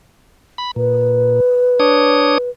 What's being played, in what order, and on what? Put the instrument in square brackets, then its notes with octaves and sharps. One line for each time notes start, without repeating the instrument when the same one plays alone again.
[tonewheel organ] B5
[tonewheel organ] A#2 [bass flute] B4
[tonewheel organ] D4 C#5 D#6